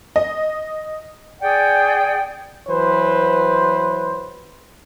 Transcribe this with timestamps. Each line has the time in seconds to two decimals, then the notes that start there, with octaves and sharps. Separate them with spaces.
0.16 D#5
1.41 G#4 D5 F#5 G5
2.69 E3 F#3 B4 C5